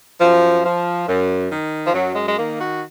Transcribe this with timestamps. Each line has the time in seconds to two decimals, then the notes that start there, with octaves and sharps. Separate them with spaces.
0.21 F#2 F3
0.65 F3
1.08 F#2
1.50 D#3
1.85 F3
1.94 F#2 F#3
2.16 G#3
2.28 G#3
2.38 D#3 A#3
2.58 F#4